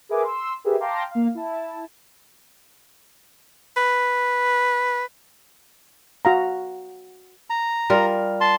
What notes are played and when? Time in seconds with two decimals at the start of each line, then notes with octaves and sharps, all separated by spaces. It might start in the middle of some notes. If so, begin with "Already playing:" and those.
0.09 G#4 A#4 B4 E5 G#5 D6
0.24 C6 E6
0.64 G4 G#4 A#4 B4 E5
0.80 F5 G5 A5 A#5 C6 D6
1.11 A#3 F5
1.35 E4 A5
3.77 B4
6.25 F#4 F5 A#5
7.50 A#5
7.90 G3 F4 A#4
8.41 A5 C6